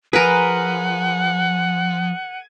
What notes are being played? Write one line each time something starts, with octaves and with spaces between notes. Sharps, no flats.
F3 G#4 A#4 B4 F#5 G#5